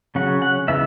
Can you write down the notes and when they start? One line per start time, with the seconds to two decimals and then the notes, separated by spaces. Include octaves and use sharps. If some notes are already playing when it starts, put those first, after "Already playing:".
0.15 C#3 F#3 C#4 F#5
0.42 F#5
0.68 C#3 E3 G#3 B3 E5